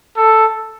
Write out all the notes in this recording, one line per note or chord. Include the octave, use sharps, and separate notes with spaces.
A4